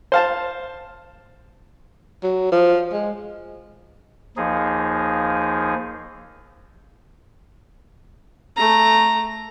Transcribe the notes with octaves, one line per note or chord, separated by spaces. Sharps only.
C5 F5 A5
F#3
F3
G#3
D#2 F3 D#4 G#4
A3 A#5